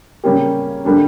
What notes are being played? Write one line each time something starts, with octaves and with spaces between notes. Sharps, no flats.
C#3 G3 A#3 C#4 G4
D3 G3 A#3 D4